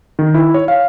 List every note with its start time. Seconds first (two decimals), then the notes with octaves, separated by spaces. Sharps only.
0.19 D#3
0.34 E4
0.54 C#5
0.68 F5